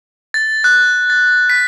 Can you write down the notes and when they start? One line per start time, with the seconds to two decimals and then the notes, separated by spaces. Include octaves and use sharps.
0.34 A6
0.64 F#6
1.10 A6
1.50 B6